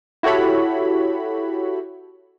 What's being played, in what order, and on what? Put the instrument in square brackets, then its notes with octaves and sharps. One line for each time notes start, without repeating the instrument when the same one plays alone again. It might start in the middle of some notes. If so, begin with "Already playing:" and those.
[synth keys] E4 F#4 G4 A4 C#5 B5